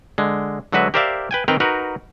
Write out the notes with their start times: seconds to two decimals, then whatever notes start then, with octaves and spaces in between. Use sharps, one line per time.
0.18 D3 G#3
0.72 D3 F#3 G#3 F#4 B4 E5
0.94 G4 A#4 C5 D5 E5 F5
1.31 B4 G5 G#5
1.48 D#3 C4 A#4 B4 G5 A#5
1.60 D#4 F#4 A#4 B4